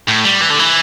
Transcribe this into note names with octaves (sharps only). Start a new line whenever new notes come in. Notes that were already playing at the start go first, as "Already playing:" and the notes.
A2
G3
E3
D3
E3